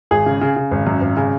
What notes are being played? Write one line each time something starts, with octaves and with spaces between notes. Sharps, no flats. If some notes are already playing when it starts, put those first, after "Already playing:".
G#1 G#4
C#3
C#3
C#3
G#1
F#2
G#1
C#3